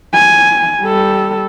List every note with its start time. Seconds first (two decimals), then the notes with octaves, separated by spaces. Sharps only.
0.14 G#5
0.82 G3 A4